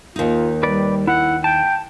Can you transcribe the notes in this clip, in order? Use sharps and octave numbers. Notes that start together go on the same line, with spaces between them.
D#2 D#4 F4
G3 B4 D5
E4 F#5
G5 A5